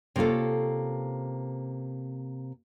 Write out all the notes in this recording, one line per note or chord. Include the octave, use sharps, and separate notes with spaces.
C3 A#3 C#4 F4 A4